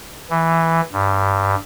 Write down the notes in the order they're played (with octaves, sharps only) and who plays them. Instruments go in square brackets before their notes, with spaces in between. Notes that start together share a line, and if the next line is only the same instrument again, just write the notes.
[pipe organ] E3
G2